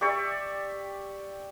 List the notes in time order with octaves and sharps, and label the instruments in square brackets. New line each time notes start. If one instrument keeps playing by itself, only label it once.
[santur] G4 D5 E5 C#6